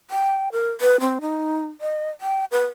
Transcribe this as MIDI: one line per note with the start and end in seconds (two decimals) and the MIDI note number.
0.10 0.49 79
0.52 0.71 70
0.81 1.00 71
1.00 1.19 60
1.21 1.66 63
1.81 2.09 75
2.21 2.45 79
2.51 2.65 71